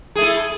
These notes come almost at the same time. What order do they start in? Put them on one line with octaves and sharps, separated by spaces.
G#4 A3 E4